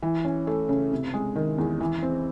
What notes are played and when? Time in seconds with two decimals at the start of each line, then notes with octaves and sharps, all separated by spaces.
0.03 E3
0.25 C#4
0.47 A3
0.69 C#3
0.92 C3
1.14 G#3
1.36 D#3
1.58 E2
1.81 E3
2.03 C4